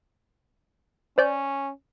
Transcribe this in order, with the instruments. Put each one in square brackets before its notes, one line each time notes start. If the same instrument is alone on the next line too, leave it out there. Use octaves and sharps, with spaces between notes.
[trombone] C#4 [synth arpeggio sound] C5 D5 G6